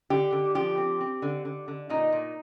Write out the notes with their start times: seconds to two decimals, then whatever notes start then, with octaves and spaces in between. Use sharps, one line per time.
0.10 D3 G4
0.32 D3
0.55 F3 G4
0.78 C4
1.01 C4
1.22 D3
1.45 D3
1.68 D3
1.89 A#2 D#4
2.12 A#2